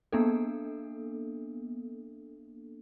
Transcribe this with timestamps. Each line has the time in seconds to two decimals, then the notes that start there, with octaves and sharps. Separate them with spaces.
0.13 A#3 B3 D4 A4